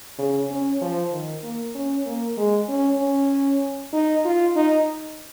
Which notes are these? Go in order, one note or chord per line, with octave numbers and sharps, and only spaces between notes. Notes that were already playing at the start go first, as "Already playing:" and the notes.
C#3
C#4
F3
D#3
A#3
C#4
A#3
G#3
C#4
C#4
D#4
F4
D#4